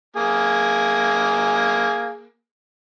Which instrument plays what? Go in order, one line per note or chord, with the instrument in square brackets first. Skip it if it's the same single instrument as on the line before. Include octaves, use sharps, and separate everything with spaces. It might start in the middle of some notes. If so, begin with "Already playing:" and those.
[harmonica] A#3 G#4